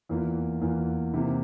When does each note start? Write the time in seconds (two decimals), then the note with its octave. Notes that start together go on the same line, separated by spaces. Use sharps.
0.09 E2 E3 A#3 F4
0.61 E2 E3 A#3 F4
1.14 C3 E3 A#3